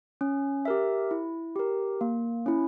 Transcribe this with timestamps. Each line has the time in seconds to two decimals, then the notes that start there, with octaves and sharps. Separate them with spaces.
0.21 C#4
0.65 G4 A#4 E5
1.11 E4
1.56 G4 A#4
2.01 A#3
2.46 C#4 E4